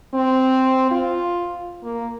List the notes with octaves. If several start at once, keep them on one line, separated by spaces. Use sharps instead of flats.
C4
F4
A#3